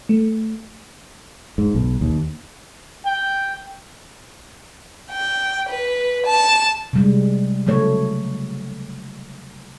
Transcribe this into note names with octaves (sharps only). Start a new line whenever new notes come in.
A3
G#2
B1
D#2
G5
G5
B4
A5
C3 G3 G#3
C#3 F#3 A3 C#5